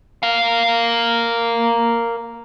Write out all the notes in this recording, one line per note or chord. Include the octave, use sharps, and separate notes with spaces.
A#4 F5